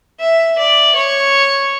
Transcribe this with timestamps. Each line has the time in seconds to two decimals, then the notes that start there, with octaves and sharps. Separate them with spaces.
0.20 E5
0.58 D5
0.95 C#5